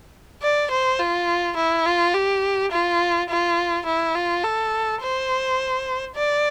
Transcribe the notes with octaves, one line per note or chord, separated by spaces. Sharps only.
D5
C5
F4
E4
F4
G4
F4
F4
E4
F4
A4
C5
D5